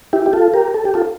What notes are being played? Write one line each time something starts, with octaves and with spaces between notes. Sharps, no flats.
E4 G4
G4
F4 A4
G4 A#4
A4
G4
F4 A4